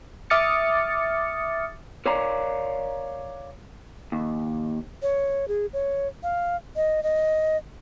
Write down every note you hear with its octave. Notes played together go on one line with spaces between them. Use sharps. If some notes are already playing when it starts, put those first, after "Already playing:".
E5 D6 D#6 F6 A6 C#7
A#4 C#5 D5 F5 A#5
D#2
C#5
G#4
C#5
F5
D#5
D#5